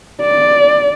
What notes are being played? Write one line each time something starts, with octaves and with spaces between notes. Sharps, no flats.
D5